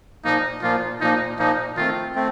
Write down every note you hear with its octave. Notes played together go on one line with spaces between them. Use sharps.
A#2 F3 A#3 D#4
A#2 F3 A#3 F4
A#2 F3 A#3 D#4
A#2 F3 A#3 D#4
D#3 A3 C4 F4
A3 C4